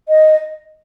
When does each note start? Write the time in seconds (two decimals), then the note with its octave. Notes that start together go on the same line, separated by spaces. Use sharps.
0.09 D#5